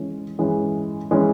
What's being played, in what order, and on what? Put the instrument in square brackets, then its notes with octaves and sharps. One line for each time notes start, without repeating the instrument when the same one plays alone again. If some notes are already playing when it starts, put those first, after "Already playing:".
Already playing: [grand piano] E3 G#3 C#4
E3 G#3 C#4
E3 G#3 C#4